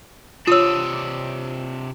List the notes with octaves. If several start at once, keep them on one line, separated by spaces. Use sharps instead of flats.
C3 D4 F4 C#5 D#6 E6